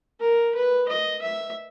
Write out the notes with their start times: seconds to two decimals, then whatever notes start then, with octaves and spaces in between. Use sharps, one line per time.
0.20 A#4
0.55 B4
0.88 D#5
1.22 E5